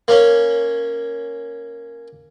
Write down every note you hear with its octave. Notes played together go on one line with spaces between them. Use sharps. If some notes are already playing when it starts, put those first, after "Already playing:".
A#3 C#4